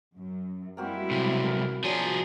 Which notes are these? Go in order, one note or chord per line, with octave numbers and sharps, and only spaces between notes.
F#2
G3 G#3 A#3 C4 E4 F#4
B1 C3
A#4
F3 F#3 D4 G#4